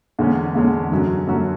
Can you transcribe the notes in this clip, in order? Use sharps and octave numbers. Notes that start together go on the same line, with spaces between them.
E2 D3 G#3 C#4
E2 D3 G#3 C#4
F#2 D3 F#3 C#4 F#4
F#2 D3 F#3 C#4 F#4